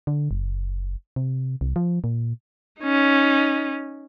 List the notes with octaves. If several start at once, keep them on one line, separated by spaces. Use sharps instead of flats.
D3
F#1
C3
C2
F3
A#2
C#4 D#4